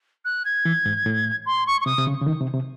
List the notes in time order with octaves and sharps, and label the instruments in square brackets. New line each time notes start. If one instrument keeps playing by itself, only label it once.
[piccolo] F#6
G#6
[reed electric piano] E3
G#2
A2
[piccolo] C6
C#6
C#6
[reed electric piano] C3 [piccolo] D#6
[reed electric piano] C3
C#3
C#3
D#3
C3
C3